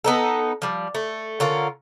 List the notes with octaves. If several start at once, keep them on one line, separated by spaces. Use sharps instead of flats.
B3 D#4 A4
F3 G3
A3
D3 C#4 F4 A#4